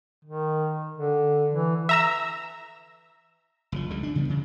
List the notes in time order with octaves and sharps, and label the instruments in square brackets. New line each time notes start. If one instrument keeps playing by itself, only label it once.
[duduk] D#3
D3
E3
[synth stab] E5 A#5 E6
[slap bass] F#1 C#3 F3
C#2 D3 G3
D4
C#3 F3 G3 B3
E1 C#3